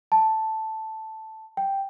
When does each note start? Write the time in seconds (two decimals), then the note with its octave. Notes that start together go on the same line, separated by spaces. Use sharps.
0.12 A5
1.57 G5